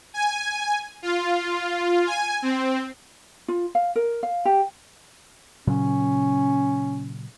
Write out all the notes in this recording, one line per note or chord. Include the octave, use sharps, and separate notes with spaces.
G#5
F4
G#5
C4
F4
F5
A#4
F5
G4
A#2 C#3 F#3 C#4